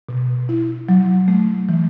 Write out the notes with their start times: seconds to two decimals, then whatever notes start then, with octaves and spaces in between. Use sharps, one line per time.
0.09 B2
0.49 E4
0.89 F#3
1.28 A3
1.69 E3